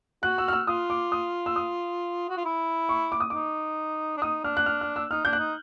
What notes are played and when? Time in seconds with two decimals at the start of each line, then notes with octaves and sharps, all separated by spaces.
0.23 F#4 F#6
0.38 E6
0.48 F6
0.53 E6
0.67 F4 D#6
0.90 D6
1.12 D#6
1.46 E6
1.56 D#6
2.29 F#4
2.37 F4
2.45 E4
2.89 C#6
3.12 D6
3.20 D#6
3.30 D#4 D6
4.17 D4
4.22 D#4 D#6
4.44 D4 F6
4.57 F#6
4.66 F6
4.81 F6
4.96 E6
5.11 D#4 F6
5.25 D4 G6
5.33 F#6
5.38 D#4